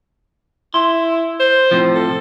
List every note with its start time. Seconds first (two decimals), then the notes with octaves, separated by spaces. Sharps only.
0.74 E4 C6
1.40 C5
1.71 A2 C3 F3
1.95 A4